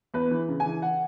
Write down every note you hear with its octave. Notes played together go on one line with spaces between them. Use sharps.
E2 B4
E3
C#3
G#5
E3
F#5